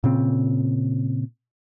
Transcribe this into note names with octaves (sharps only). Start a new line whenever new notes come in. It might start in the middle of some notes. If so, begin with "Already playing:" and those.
A#2 C#3 C4